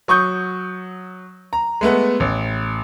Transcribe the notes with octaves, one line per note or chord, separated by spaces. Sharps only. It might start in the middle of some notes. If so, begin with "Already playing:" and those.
F#3 C#6 D#6 G6
A#5
G#3 A3 B3
A1